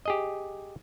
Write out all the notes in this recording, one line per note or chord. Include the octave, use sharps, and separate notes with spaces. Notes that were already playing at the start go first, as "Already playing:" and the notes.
G4 G#4 D#5